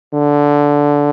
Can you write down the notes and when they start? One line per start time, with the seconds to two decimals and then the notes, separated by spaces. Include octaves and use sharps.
0.14 D3